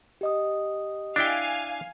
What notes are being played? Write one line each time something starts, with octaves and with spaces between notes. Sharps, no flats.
G4 D#5 D#6
D4 E4 F5 G5 G#5